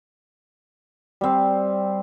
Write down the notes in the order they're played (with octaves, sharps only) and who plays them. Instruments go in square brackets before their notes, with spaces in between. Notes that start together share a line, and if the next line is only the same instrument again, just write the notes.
[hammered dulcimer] G3 C4